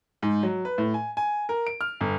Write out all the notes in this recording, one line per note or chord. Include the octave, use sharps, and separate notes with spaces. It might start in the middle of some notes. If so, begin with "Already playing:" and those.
G#2
F#3
B4
A2
G#5
G#5
A#4
D7
F6
G1